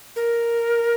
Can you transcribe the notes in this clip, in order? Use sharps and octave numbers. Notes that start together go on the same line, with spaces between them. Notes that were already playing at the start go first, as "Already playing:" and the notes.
A#4